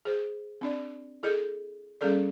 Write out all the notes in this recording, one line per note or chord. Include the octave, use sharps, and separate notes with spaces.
G#4 C5
C4 D4 D5
E4 G#4 A4 D#5
G3 A#3 C#4 G#4 A4 D5